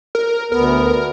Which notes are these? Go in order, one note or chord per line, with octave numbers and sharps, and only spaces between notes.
A#4
D2 B3 A#4